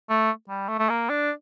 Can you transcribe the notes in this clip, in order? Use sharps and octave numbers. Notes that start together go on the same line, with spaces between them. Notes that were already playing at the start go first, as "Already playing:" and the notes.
A3
G3
A3
A3
A#3
D4